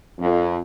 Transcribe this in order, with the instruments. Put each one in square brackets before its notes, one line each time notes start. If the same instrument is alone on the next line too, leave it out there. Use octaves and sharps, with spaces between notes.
[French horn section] F2